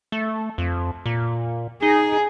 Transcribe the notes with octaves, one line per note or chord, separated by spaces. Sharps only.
A3
F2
A#2
D#4 G#4